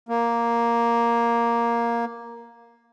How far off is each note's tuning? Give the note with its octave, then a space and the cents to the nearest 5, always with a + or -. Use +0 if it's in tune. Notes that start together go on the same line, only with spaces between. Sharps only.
A#3 +5